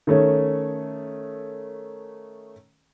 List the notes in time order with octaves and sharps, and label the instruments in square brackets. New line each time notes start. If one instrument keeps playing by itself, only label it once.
[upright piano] D#3 A3 C#4